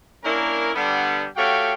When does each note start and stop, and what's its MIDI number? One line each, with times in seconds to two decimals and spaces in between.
0.24 0.70 58
0.24 0.70 61
0.24 0.70 62
0.24 0.70 64
0.24 0.70 70
0.74 1.25 50
0.74 1.25 55
0.74 1.25 59
1.36 1.73 57
1.36 1.73 66
1.36 1.73 67
1.36 1.73 73
1.36 1.73 77
1.36 1.73 79